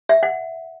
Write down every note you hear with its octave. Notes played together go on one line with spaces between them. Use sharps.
E5
F#5